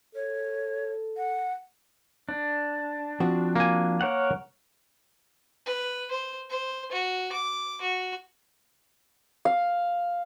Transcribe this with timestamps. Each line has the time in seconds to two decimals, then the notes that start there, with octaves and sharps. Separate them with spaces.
0.15 A4 C#5
1.17 F#5
2.29 D4
3.20 F3 C4 F#4
3.56 A#3 G#5
4.01 A#4 C#5 F#5
5.66 B4
6.11 C5
6.50 C5
6.91 F#4
7.32 D6
7.81 F#4
9.45 F5